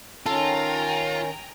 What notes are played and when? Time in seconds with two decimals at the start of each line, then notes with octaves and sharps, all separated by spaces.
0.26 D#3 C#4 F4 A4 G5 G#5 A#5